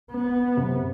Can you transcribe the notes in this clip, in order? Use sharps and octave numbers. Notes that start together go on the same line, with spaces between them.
B3
F#2 C3